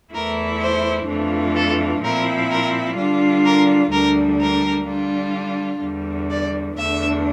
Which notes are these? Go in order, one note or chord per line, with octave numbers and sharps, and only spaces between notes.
E2 E3 A3 E4 A#4
C5
F2 E3 A3 D4 F4
A4
A#2 F3 C4 E4 A#4
A#4
D3 G3 D4 F4
A#4
D2 D3 G3 D4 A#4
A#4
D3 G3 D4 F4
E2 D3 G3
D5
E2 D3 A3 D4 E5